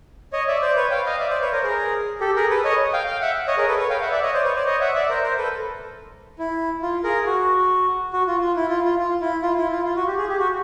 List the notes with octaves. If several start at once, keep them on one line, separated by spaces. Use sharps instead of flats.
C#5 D#5
D5 E5
C5 D5
B4 C#5
F5 G5
D#5 F5
D5 E5
C5 D5
B4 C#5
A#4 C5
G#4 A#4
G4 A4
G#4 A#4
A4 B4
C#5 D#5
F5 G5
F5 G5
E5 F#5
C#5 D#5
G#4 A#4
A4 B4
B4 C#5
F5 G5
E5 F#5
D5 E5
C#5 D#5
C5 D5
B4 C#5
C5 D5
C#5 D#5
E5 F#5
D5 E5
A#4 C5
A#4 C5
A4 B4
E4
F4
G#4 A#4
F#4
F#4
F4
F4
E4
F4
F4
F4
E4
F4
E4
F4
F4
F#4
G4
G#4
G4
F#4